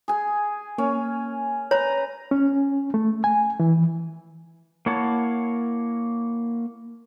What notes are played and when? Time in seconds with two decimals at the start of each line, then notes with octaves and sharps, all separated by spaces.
0.08 G#4 G#5
0.78 A#3 C#4
1.71 B4 C#5 A#5
2.31 C#4
2.94 A3
3.24 G#5
3.60 E3
4.86 A#3 E4 C#5 F#5 A5